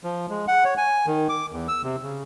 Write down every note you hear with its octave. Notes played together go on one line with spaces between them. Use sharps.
F3
G#3
F#5
C#5
G#5
D#3
D6
E2
E6
C3
C#3